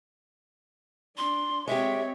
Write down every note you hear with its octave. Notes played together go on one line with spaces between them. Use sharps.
D4 C6
G#3 C4 G4 C#5 E5